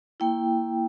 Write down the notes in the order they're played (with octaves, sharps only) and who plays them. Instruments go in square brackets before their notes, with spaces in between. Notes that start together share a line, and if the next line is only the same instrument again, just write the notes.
[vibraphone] A#3 E4 G5